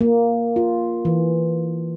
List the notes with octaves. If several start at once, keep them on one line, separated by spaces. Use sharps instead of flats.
A#3
F4
E3